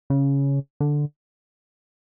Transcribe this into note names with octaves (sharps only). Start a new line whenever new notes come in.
C#3
D3